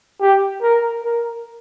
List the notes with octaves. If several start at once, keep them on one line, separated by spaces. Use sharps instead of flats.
G4
A#4
A#4